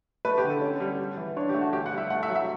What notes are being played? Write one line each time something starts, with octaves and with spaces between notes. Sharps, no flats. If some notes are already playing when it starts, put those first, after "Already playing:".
A3 B4
G4
D3
A4
C#4
G3
G3
E3
D4 C#5
G4
A3
F#4
D2 G4
F#5
G3
E5
A3 F#5
E5
F#3
E5